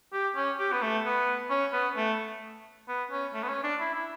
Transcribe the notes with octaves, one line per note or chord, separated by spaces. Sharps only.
G4
C#4
G4
B3
A3
B3
C#4
B3
A3
B3
C#4
A3
B3
C#4
D4
E4
E4